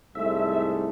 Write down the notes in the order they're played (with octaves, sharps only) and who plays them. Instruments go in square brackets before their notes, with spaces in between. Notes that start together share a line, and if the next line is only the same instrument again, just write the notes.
[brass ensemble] C2 G#2 A3 [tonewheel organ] E5